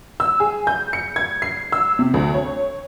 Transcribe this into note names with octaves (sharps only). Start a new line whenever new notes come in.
E6
G#4
G6
C#7
G#6
C7
E6
C3
D2
C#5